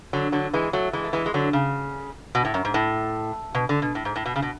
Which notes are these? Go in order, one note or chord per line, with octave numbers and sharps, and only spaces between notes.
D3 F#3
D3 F#3
E3 G#3
F#3 A3
E3 G#3
A3
E3 G#3
G#3
D3 F#3
C#3
B2
A2
F#2
G#2
A2
B2
D3
B2
A2
G#2
A2
B2
C#3
B2